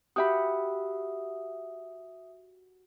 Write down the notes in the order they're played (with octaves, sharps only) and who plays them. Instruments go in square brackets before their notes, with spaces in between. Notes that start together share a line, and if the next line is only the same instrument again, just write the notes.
[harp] F#4 G4 B5 [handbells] E5 D#6